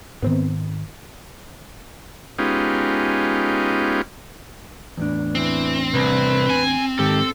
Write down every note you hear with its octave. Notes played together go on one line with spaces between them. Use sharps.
G#2 D#3 B3 C4
G#3 B3 C#4 D#4 F4 G4
E2 A2 D4
E3 C4
C2 B4
G#5
G#2 D#3 G4 A4